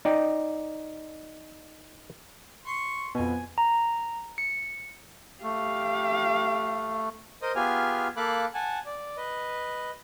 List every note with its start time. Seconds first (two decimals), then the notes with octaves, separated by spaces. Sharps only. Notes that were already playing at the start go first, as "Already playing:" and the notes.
0.05 D#4 D5 G5
2.65 C6 C#6
3.15 F2 B2 G#5
3.58 A#5
4.38 C#7
5.43 A3 G4 F5
7.42 A#4 C5 D#5 D#6
7.56 B3 F4 G4 G#4 G#5 F6
8.17 A#3 A4 F5 B5 D6 F#6
8.54 F#5 G#5 A5
8.86 D5
9.17 B4 D#5